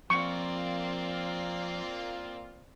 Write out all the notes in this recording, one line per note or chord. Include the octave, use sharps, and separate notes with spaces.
F2 A#3 C4 F4 D5 C#6